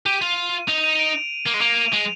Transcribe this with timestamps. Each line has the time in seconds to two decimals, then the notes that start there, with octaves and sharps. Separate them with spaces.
0.06 G4 D#7
0.21 F4
0.68 D#4 F7
0.84 D#7
0.99 D7
1.46 A#3
1.54 G#3
1.61 A#3 F7
1.77 D#7
1.92 G#3